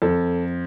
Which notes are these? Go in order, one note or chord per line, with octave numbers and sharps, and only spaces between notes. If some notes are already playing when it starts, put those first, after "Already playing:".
F2 A4